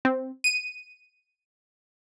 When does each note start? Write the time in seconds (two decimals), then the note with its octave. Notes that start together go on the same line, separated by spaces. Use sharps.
0.05 C4
0.44 D#7